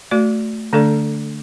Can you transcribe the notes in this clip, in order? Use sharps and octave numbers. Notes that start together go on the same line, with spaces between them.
A3 F#4 D5
D3 A3 D4 A4 D5